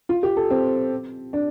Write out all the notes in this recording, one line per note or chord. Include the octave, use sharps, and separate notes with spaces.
F4
G4
A4
C4
D4